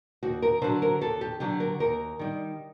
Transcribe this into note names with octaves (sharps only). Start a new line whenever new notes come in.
D#2 F#4
A#4
D3 F#3 C5
A#4
D#2 A4
G4
D3 F#3 G4
A#4
D#2 A#4
D#3 G3